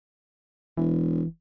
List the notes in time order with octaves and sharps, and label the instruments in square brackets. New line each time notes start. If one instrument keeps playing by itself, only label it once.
[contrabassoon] E1 [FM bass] E3